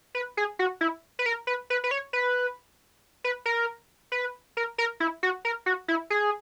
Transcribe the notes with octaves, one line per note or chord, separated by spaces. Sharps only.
B4
G#4
F#4
E4
B4
A#4
B4
B4
B4
C#5
B4
B4
A#4
B4
A#4
A#4
E4
F#4
A#4
F#4
E4
G#4